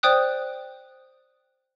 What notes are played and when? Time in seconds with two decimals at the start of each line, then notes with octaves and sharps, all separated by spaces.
0.03 C5 D5 G5 D#6 F#6